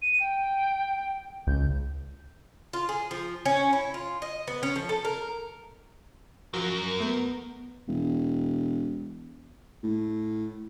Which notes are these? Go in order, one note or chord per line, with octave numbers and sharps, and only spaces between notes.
D#7
G5
C#2 G6
F4
G#4
F3
C#4
E4
F4
D#5
B3
C#4
F3
A4
A#4
F#2 F3 F#3 F#4 A#4 F6
A3 B3 G6
E1
A2